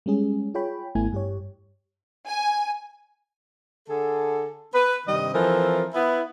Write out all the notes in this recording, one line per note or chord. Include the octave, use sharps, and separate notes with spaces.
G3 G#3 C#4 G#4
F4 G#4 C#5 G5 B5
G#1 A3 B3 E4 G#5
G2 G4 C#5
G#5
D3 G#4 A4
B4
G2 C3 D#3 G3 D#5
E3 F3 C4 A4 A#4
B3 E4